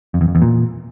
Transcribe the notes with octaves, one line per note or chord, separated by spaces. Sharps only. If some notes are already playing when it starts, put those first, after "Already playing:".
F2
E2
F2
E2
A#2